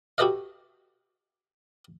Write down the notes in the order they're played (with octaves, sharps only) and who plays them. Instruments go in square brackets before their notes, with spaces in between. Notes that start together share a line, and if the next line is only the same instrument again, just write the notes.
[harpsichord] F#4 G4 A4 B4 D#5 F5